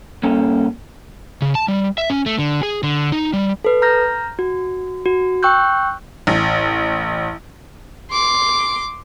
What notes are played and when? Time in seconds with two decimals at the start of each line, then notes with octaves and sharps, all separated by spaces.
0.23 G2 A#3 C#4 A4
1.42 C#3
1.55 A5
1.68 G3
1.98 E5
2.10 C#4
2.26 A3
2.39 D3
2.63 G#4
2.83 D3
3.12 D#4
3.33 G3
3.64 A4 B4
3.82 A#5 F6 G6 A#6
4.39 F#4
5.05 F#4
5.43 G5 C#6 E6 F#6 G6
6.27 A1
8.12 C6 D6